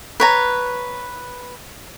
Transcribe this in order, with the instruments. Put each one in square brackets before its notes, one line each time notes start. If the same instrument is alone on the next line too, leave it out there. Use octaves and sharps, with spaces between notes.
[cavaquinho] B4 C#5 A#5